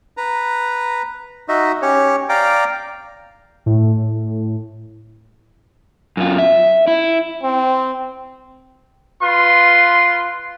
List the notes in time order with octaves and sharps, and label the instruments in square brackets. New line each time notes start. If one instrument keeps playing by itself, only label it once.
[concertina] B4 A#5
D#4 F#4 D#5 E5
C#4 G4 C#5
D5 F5 G5 A#5 D6
[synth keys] A2
[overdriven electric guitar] F#2 F4
E5
E4
[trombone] C4
[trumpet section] F4 B4 C6